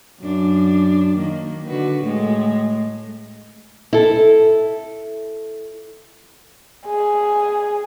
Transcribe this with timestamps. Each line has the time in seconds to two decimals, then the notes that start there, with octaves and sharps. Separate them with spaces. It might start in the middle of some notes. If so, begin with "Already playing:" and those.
0.21 F#2 D4
1.16 D#3 A#3
1.66 D3 F#4 B4
2.03 A2 G#3 A3
3.93 E4 A4
6.86 G#4